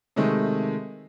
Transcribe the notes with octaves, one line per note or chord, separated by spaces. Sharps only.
C3 D#3 G#3 A3